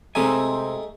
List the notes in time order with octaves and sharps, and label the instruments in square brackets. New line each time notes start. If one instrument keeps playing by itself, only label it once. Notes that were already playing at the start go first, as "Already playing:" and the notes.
[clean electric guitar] C3 C4 G#5 [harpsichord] G#3 A3 D#4